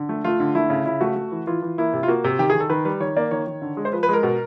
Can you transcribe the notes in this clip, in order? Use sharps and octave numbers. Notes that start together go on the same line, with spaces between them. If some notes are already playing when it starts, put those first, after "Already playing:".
Already playing: D3
A3
A3 F4
D3
A3 E4
C#3
C#3 E4
A3 F#4
A3
E3
E3 F4
E3
A#3 E4
C3
F4
A#3 F#4
C3
D#3 G4
G#4
D#3
A4
D#3 B4
G3 B4
D#3 C#5
A#3 D5
D#3 C#5
D#3
D3
G#3
C5
F3 B4
B4
G#3 A#4
B2